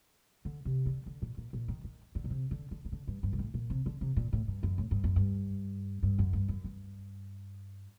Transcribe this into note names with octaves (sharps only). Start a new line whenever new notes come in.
D3
C3
D3
D3
A#2
A#2
A#2
D#3
D#3
D3
A#2
C3
D3
D3
D#3
D3
G2
G2
A#2
A2
A#2
C3
D3
C3
A#2
A2
G2
F#2
A2
G2
F#2
G2
G2
F#2
G2
F#2
G2